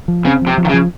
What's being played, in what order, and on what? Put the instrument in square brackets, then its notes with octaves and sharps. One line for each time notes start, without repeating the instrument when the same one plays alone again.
[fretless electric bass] F3
[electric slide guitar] C#3 [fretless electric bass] C4
[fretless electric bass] F3
[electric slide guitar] C3
[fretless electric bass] F3
[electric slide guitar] D#3
C#3
[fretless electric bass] F3